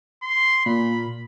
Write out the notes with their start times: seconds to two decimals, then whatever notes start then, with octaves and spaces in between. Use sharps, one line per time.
0.23 C6
0.66 A#2 B5